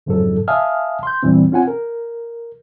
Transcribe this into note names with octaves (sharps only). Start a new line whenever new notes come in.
F2 G#2 C#3 F3 F#3 A4
E5 F5 G#5 A5 D#6 F6
C6 G6
E2 A#2 E3 G3 C4
C4 C#4 F4 F#5 G#5
A#4